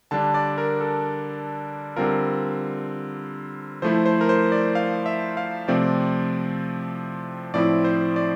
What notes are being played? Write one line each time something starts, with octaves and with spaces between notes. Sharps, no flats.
D3 G3 D4 A5
D5
A#4
A4
D3 G3 C4 F4 A#4
F3 A3 E4 C5
C5
A#4
C5
D5
F5
E5
F5
C3 F3 A3 C4 D5
A2 F3 C4 E4 D5
C5
D5